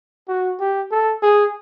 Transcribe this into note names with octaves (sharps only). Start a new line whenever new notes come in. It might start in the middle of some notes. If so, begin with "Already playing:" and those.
F#4
G4
A4
G#4